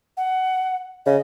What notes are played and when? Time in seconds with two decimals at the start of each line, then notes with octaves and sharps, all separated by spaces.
0.17 F#5
1.06 C#3 D#5